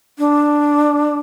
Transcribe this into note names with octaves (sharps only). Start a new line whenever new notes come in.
D4